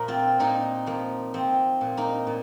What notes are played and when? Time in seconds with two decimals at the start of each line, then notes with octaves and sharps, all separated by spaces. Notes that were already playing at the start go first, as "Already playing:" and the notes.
Already playing: A#2 F3 A#4
0.08 C4 F4
0.39 A#2 A#3 D#4
0.86 F3 A#3
1.34 F3 C4
1.81 A#2
1.97 A#3 D#4
2.27 A#2